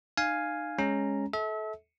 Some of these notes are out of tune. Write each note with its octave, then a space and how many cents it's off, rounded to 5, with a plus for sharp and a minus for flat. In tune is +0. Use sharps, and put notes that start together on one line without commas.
D#4 -30 F5 +0 G#5 +0
G#3 +0 C#4 +0 A#5 +0
A4 -25 E5 -35